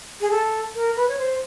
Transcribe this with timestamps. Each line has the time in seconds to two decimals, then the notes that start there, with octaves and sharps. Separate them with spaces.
0.21 G#4
0.31 A4
0.75 A#4
0.96 B4
1.08 C#5
1.19 C5